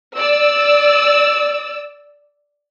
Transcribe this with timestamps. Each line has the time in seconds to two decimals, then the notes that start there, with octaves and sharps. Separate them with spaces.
0.17 D5 E6